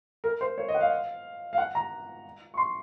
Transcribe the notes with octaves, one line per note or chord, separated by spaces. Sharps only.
A#4
C5
C#5
D#5
F#5
F5
F5
F#5
A#5
C#6
C6